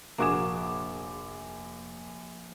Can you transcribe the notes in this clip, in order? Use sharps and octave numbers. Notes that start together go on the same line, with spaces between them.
F1 A#1 A#3 F#4 G#4 D6 E7